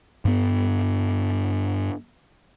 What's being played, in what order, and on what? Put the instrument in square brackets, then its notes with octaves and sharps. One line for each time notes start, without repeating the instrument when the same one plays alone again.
[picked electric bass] G2 B3